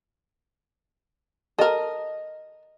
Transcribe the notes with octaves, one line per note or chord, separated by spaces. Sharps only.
A4 A#4 D#5